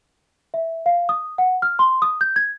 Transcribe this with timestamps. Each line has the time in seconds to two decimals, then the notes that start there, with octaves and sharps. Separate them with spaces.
0.54 E5
0.86 F5
1.09 D#6
1.38 F#5
1.62 F6
1.79 C6
2.02 D#6
2.21 G6
2.36 G#6